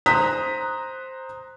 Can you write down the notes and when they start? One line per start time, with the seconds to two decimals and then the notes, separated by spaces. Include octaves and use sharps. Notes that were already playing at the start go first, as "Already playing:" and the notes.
0.06 C5 A#5 D#6 F#6 B6